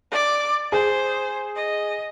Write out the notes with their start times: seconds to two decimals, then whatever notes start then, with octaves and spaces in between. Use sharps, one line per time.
0.12 D5 D6
0.72 G#4 C5
1.56 D#5